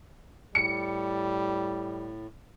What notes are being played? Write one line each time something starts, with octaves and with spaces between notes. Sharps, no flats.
A2 G3 C#7